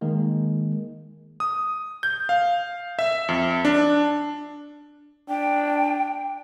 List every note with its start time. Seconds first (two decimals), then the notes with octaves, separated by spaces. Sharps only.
0.01 D#3 G#3 A#3
1.40 D#6
2.03 G6
2.29 F5
2.99 E5
3.29 F2
3.65 D4
5.29 D4 G5